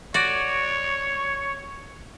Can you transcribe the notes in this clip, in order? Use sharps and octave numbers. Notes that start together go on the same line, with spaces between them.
F#4 C#5 D5